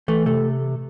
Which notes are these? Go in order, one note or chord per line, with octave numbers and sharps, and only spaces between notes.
E3 A3
C3 A3